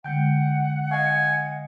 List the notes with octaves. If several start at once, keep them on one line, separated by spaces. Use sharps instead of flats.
D3 G#3 F#5 G5 G6
D#5 F5 G#5 C#6